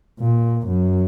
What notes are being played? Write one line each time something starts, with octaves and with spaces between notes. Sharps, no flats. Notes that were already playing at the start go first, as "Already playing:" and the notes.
A#2
F#2